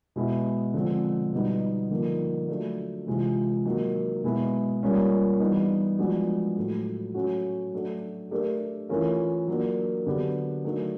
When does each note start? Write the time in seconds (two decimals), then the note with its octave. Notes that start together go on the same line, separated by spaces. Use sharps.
0.16 B2 G#3 B3 E4
0.74 D3 F3 G#3 C4
1.32 B2 G3 B3 D#4
1.90 D3 F3 A#3 D#4
2.49 F#3 A3 D4
3.07 C3 E3 G#3 C4 F4
3.65 D#3 F#3 A#3 D#4
4.23 B2 G#3 B3 E4
4.82 G3 A#3 C#4 F4
5.40 E3 G3 B3 D#4
5.99 F3 G#3 B3 D4 F#4
6.56 A2 F#3 A3
7.14 F#3 A3 C#4 F#4
7.73 F#3 A3 D4 F#4 A4
8.31 A3 D4 G4 A#4
8.89 E3 A3 C#4 F4 A#4
9.48 F#3 A#3 D4
10.06 D3 F#3 B3 D4 G4
10.64 D#3 F#3 A3 D4